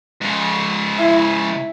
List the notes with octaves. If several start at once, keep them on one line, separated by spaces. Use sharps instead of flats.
G#2 C#3
E4